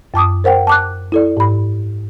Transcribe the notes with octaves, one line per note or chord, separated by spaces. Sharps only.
F#2 A5 D6 D#6
A#4 C5 F#5 G5
A5 D6 F#6
E4 A4 D5
G#2 B5